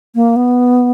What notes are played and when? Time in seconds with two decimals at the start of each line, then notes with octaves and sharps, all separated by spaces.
0.15 A#3
0.36 B3